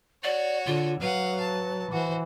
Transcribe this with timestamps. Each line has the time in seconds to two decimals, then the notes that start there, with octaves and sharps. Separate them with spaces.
0.24 F#4 C#5 D5
0.66 D3 F4
1.01 F#3 B4 F5 F#5
1.40 A5
1.92 E3 F#4 C5